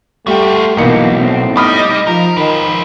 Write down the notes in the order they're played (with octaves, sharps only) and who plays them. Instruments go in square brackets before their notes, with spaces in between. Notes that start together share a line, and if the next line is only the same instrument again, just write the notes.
[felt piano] G3 G5 [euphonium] A3 [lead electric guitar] F4 F#4
[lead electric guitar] B1 [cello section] B2 E3 [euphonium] A#3 [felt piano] D#4 C#7
[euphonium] A2 [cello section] B3 C4
[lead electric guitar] G3 [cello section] D#4 D#5 [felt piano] B5 D#6 F6
[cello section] F3 [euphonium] F4 [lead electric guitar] A#4
[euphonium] D#3 [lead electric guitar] F4 B4